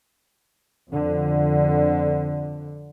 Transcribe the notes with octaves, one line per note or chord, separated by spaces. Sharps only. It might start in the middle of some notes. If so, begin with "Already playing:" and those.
F2 D3